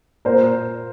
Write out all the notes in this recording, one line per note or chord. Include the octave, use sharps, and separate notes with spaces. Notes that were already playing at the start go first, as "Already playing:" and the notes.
A#2 A#4 C5